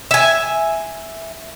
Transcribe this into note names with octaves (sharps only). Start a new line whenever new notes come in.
E5 G#5